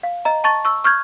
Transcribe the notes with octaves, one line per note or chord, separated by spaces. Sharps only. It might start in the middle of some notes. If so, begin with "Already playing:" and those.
F5
D#5 A#5
A5 C#6 A6
C#6 E6
C#6 F6 G6 G#6